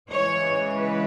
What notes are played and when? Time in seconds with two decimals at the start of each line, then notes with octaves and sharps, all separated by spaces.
0.11 C#3 E3 G#3 C#5
0.75 B4